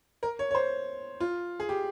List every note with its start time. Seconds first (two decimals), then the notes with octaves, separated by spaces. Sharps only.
0.23 A#4
0.39 C#5
0.51 C#5
0.55 C5
1.20 F4
1.60 G#4
1.69 G4